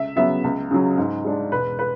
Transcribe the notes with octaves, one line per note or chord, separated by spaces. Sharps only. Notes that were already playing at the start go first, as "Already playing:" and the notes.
Already playing: C#2 E5
C#3 F#3 B3 E5
C#2
C#3 F#3
G#2
G#3 D4
E1 B4
B4